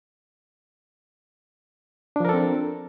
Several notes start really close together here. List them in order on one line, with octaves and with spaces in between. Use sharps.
D4 F3 A#4 A4 C4